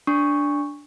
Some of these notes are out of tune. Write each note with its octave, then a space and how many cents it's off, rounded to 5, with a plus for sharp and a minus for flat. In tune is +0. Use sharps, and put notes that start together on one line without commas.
D4 -5 C#6 +0